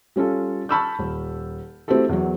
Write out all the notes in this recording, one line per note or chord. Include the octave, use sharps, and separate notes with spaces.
G3 C#4 F4 A4
A5 B5 C#6 E6 F6 G6
D#1
A3 C4 E4 F#4 G4 A4
E2 F#3